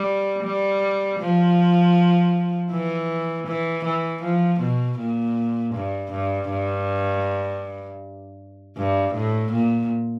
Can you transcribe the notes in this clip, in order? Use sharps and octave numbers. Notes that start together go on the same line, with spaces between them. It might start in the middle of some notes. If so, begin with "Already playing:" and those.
Already playing: G3
G3
F3
E3
E3
E3
F3
B2
A#2
G2
G2
G2
G2
A2
A#2